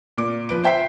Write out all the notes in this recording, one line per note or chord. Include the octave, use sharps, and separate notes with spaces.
A#2 D6
F3 B4 D7
C5 E5 G5 B6 C7